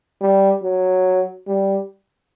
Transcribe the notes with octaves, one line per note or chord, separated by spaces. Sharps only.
G3
F#3
G3